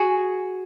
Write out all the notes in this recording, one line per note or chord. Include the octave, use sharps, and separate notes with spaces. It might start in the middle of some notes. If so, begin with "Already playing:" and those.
Already playing: F#4 G#4